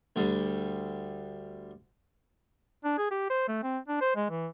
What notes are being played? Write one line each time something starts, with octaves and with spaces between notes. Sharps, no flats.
D2 D3 G3
D4
G#4
G4
C5
A3
C4
D4
C5
G#3
E3